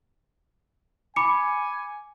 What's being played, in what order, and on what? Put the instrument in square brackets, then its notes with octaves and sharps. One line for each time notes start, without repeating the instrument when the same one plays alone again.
[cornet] G#5 [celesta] B5 D6 C#7